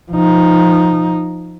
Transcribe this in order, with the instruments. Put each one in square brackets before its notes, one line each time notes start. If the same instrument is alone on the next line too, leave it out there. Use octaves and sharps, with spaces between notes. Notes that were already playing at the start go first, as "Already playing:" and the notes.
[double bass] F3 D#4